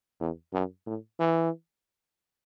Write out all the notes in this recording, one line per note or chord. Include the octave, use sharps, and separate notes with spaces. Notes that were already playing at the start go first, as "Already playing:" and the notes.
E2
F#2
A2
E3